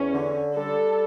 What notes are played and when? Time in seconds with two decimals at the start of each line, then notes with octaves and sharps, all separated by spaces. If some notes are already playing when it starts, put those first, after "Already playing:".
Already playing: E2 C#4
0.14 D3
0.56 G3 A4